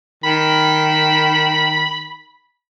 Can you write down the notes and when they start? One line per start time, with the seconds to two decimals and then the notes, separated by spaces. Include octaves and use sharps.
0.24 D#3 B5